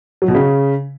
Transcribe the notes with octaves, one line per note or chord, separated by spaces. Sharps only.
F#3
B2
C#3